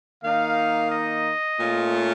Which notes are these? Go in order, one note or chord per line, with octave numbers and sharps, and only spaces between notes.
D#3 A#3 D#4 F5
D#5
A#2 A3 C#4 F4